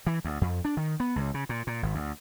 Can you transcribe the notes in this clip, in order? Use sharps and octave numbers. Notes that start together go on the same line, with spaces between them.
E3
D2
F2
D4
D#3
B3
C#2
C#3
A#2
A#2
G#1
D2